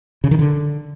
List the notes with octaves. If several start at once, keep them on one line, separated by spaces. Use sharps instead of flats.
C#3
D#3
D3